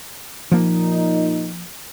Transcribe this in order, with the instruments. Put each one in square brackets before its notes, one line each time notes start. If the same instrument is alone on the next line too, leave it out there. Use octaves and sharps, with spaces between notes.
[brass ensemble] A#2 D#4 [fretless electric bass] F3 A#3